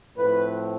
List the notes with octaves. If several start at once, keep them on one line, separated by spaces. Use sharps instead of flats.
A2 F3 C4 B4